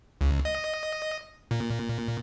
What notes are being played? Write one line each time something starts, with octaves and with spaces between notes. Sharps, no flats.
C#2
D#5
A#2